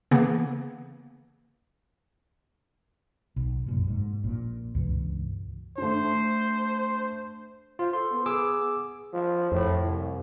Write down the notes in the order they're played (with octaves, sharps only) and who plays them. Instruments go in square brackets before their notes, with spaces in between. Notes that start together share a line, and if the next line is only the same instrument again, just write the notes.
[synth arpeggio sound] C#3 E3 A#3 B3
[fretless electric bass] B1
F1 F#2 A#2
G#2
A#1 A#2
C#2 G2 B2 E3
[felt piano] A3 D4 [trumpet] C5
[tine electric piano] F4 [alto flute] C5
[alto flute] A4 [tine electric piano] C6
[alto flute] B3
[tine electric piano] G#4 D6 E6
[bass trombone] F3
[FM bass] F2 [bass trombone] A2
[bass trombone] C2